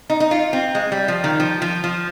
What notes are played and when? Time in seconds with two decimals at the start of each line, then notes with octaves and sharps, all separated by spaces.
0.10 D#4
0.20 D#4
0.31 F4
0.53 C4
0.75 G#3
0.92 G3
1.08 F3
1.24 D#3
1.40 F3
1.62 F3
1.84 F3